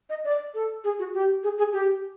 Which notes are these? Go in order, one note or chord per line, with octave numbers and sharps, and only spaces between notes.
D#5
D5
A4
G#4
F#4
G4
G#4
G#4
G4